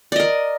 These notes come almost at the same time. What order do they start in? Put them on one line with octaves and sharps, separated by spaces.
D5 D#5 A#4